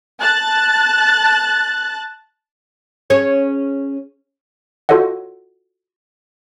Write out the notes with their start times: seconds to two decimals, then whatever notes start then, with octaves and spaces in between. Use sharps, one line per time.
0.21 A5 F#6 A6
3.10 C#4 G#4 C#5
4.89 F4 F#4 A4 C#5 D#5 F#5